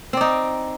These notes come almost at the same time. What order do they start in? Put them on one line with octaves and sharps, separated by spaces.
C4 D5 D#4